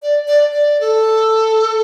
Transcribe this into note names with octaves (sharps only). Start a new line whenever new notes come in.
D5
D5
D5
A4